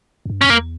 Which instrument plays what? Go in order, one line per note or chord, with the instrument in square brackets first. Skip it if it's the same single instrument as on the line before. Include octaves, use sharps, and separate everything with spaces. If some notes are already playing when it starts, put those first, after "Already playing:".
[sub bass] F2
G2
[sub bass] F2 [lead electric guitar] C#4
[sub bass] E2 [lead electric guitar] A#3